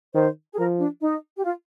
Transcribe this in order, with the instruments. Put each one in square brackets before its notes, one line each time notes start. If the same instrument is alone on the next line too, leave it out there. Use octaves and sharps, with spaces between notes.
[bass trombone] D#3 [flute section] C5
[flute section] G#4
[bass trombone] F3 [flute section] A#4
[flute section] D4
D#4
G4
F4